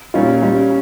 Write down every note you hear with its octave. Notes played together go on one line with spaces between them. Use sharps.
A#2 G3 C#4 F4
G3 C#4 F4